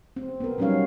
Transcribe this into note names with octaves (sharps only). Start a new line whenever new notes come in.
C4
B3 A#4
F#3 G3 C#4 D#4 C#5 F5